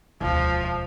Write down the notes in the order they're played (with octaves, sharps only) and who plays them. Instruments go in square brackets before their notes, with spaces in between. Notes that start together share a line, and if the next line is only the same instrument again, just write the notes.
[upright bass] E1 D2 [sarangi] F3